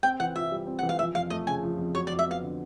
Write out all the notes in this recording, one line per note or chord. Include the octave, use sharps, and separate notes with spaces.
C4 G5
E3 F#5
F4 E5
G3
C4
E3 F#5
F5
F3 E5
F2 F5
A3 D#5
C#3 G#5
F3
F2
F#3 C#5
D5
F2
E5
B3 F5
D3